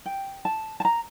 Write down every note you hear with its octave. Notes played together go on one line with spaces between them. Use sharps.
G5
A5
A5
A#5